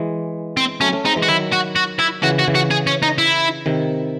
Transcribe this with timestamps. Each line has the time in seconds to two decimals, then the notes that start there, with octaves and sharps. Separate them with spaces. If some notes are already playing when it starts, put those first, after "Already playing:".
Already playing: E3 G#3
0.57 C4
0.81 F#3 A3 C#4
0.92 A3 C#4
1.05 G#3 C4 D#4
1.16 E3 G#3
1.22 F#4
1.28 D#3 F#3 E4
1.52 F#4
1.76 F#4
1.99 E4
2.23 C#3 E3 F#4
2.39 F#4
2.48 C#3 E3
2.55 F#4
2.71 G#4
2.87 C#4
3.03 D#4
3.18 E4
3.66 C3 D#3